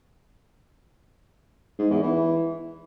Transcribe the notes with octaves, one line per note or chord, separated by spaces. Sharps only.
G#2
E2
E3